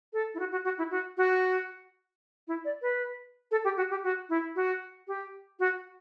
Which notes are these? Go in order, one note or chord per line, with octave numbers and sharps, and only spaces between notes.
A4
E4
F#4
F#4
F#4
E4
F#4
F#4
E4
D5
B4
A4
G4
F#4
G4
F#4
E4
F#4
G4
F#4